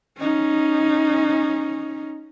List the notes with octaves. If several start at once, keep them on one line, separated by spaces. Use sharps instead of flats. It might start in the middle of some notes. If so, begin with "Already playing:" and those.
C#4 D#4